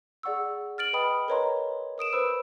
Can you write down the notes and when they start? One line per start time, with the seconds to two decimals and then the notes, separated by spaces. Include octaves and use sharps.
0.23 G#4 D5 F#5 C#6 E6
0.78 F6 A6 D7 F#7
0.93 B4 D#5 G5 B5 D#6
1.28 A#4 B4 C#5 D#5 A#5 C6
1.98 A#4 D#6 D7 E7
2.13 B4 C5 B5 E6